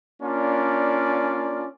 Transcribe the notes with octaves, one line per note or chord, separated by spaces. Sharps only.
A#3 C#4 D4 F4 D5